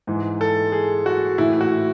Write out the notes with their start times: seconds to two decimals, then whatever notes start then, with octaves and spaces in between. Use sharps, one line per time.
0.07 G#2 E3
0.41 A4
0.72 G#4
1.06 F#4
1.38 A2 E3 E4
1.61 F#4